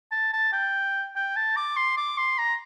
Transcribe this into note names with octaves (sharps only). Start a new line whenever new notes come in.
A5
A5
G5
G5
A5
D6
C6
D6
C6
A#5